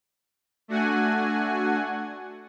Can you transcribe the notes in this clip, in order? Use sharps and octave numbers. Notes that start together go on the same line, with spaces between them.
A3 D4 F#4 F#5 G#5